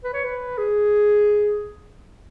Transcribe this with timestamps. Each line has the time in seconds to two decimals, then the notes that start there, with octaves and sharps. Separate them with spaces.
0.04 B4
0.14 C#5
0.24 B4
0.58 G#4